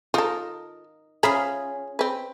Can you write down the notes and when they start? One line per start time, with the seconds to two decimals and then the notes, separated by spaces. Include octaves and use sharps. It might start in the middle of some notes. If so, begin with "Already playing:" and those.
0.14 D#4 F4 A4 A#4
1.23 C#4 F4 G#4 E5 A#5 B5
1.99 C4 B4